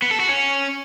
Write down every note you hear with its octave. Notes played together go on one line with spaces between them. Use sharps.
B3
A4
F#4
C#4